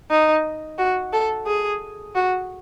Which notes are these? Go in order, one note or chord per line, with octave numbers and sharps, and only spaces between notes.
D#4
F#4
A4
G#4
F#4